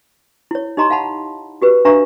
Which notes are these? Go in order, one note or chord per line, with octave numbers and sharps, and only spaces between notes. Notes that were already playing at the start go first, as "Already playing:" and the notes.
E4 C#5
D#4 G4 D#5 A#5 C6
F5 F#5 A5 B5
F#4 G4 B4
D4 B4 E5 F5 A#5 C#6